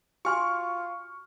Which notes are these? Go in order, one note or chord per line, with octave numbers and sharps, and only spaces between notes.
F4 F#4 G#5 C6 C#6 F6